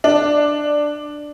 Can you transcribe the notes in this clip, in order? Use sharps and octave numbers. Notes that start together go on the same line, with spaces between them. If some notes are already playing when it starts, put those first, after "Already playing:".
D4